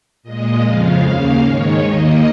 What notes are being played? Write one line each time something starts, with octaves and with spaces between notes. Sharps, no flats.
A#2 G#3 D#5
F2 C#3 F3 G#3 F5
D#2 C#3 A#3 F5
G#2 D#3 G#3 C#5
D#2 D#3 A#3 D#5